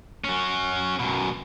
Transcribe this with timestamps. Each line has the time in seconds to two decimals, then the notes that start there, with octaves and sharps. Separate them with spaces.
0.24 C#4 F#4
1.00 F#2 B2